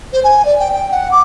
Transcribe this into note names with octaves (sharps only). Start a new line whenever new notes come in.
C5
G#5
D5
G5
G5
F#5
D6